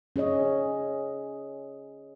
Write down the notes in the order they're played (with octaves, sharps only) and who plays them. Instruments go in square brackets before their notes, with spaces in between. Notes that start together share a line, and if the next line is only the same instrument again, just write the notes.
[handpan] C#4 G#4 C#5 D#5